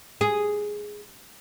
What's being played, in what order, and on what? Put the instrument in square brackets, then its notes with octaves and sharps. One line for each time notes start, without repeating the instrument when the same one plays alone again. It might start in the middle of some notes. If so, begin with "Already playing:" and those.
[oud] G#4